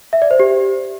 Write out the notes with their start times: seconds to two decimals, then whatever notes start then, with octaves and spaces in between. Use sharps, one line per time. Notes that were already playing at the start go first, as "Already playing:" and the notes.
0.13 E5
0.22 D5
0.31 C5
0.40 G4